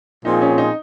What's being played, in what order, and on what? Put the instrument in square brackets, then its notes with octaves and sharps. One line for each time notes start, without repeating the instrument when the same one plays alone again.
[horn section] A#2 F3 C4 F4 G#4 [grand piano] D#4
[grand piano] C#4
D#4